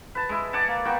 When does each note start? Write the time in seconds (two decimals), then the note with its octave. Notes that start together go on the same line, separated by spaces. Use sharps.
0.15 B4 A5
0.29 G#3 E4
0.53 D5 F#5 G#5 A5
0.68 A#3
0.85 A#3 B3 F#4 G5